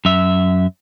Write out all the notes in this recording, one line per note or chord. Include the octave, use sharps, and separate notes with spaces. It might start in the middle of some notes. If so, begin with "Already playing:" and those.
F#2 E5